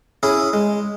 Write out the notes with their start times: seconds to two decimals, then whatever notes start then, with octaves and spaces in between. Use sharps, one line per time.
0.23 C#4 E4 G#4
0.53 G#3